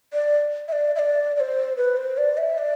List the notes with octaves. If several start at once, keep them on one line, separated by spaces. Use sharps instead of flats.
D5
E5
D5
E5
D5
D5
C5
B4
C5
D5
E5
D5